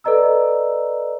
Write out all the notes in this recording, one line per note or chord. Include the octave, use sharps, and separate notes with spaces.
A4 B4 D5 D#5 A#5 E6